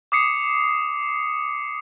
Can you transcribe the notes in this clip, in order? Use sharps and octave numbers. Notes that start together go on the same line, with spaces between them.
D6 D#6 C7 C#7